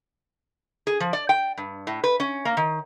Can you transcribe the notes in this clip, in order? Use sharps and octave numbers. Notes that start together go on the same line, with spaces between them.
G#4
F3
D5
G5
G2
A2
B4
C#4
A#3
D#3